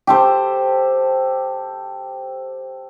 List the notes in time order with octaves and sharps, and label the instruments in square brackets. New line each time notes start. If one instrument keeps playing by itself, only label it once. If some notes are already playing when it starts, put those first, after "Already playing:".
[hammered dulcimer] G4 A4 C5